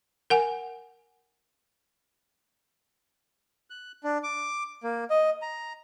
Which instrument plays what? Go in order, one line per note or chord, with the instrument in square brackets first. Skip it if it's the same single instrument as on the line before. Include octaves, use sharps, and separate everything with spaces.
[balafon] A#4 F#5 G#5
[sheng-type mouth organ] F#6
D4
D6
A#3
D#5
A#5